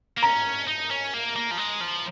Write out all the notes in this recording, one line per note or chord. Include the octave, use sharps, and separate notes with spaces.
A#3
C#4 A#5
D#4
C#4
A#3
A#3
F3
G#3
F3